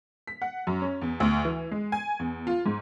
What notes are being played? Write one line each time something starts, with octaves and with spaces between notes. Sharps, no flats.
B6
F#5
F#2
C#4
E2
D2
E3
G#3
G#5
E2
F4
G#2